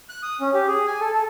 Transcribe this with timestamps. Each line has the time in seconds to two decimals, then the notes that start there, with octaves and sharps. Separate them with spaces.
0.09 F#6
0.23 D#6
0.41 C#4
0.54 G4
0.67 G#4
0.87 G#5
1.01 A4
1.15 A4